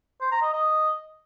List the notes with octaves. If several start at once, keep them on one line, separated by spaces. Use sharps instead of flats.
C5
A#5
D#5
D#5